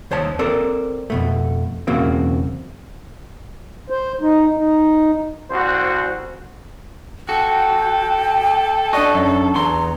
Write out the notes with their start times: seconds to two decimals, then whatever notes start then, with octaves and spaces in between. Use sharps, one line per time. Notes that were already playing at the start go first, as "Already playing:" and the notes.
0.11 D#2 C5 C#5 A5
0.39 C4 A4 A#4 C5 D5
1.10 F2 B2 A3
1.87 B1 E2 C#3 A#3 C4 F#4
3.90 C5
4.21 D#4
4.57 D#4
5.51 C2 F#4 C5
7.29 F#4 A4 G5
8.93 D4 F#4 D5 D#5 C#6
9.14 F#2
9.56 E2 A#5 C6